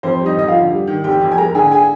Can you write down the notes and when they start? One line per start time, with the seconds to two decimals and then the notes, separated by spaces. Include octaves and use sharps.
0.03 F2 C4 C5
0.20 G3
0.26 D#4 D#5
0.37 F2 D#5
0.48 F4 F5
0.54 D3
0.71 G3
0.87 D#3
1.04 F1 G4 G5
1.21 F2
1.31 G#5
1.38 G#3 A#4 A#5
1.55 D3 G#4 G#5
1.71 G#4 G#5